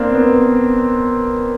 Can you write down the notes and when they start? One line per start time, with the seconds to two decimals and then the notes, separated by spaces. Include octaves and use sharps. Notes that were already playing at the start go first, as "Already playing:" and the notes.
Already playing: A#3 C4 D4
0.15 B3